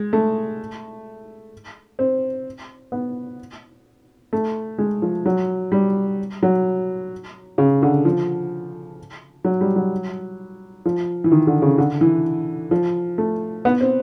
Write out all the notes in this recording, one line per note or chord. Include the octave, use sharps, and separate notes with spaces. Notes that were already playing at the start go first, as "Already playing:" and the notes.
Already playing: G#3
A3
C4
B3
A3
G#3
F3
F#3
G3
F#3
C#3
D3
F3
F#3
G3
F#3
F3
E3
D#3
D3
C#3
D3
E3
F3
A3
B3
C4